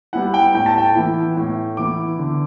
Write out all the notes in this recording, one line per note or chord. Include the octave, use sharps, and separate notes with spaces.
G3 B3 E4 F#5
G5
A2 G5
A5
G5
E3 B3 E4
A2
E3 B3 E4 D6
D3